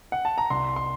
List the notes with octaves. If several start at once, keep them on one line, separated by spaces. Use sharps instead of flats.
F#5
A5
A#5
C2 C6
C6